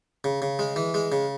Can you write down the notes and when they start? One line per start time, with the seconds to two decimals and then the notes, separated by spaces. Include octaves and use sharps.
0.24 C#3
0.42 C#3
0.59 G#3
0.76 E3
0.94 G#3
1.12 C#3